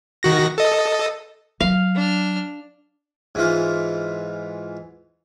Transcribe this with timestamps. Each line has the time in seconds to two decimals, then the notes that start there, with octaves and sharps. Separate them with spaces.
0.23 D#3 F#4 A#6
0.58 A4 D#5
1.60 F#3 F5
1.95 D4 F6
3.35 G#2 E3 F4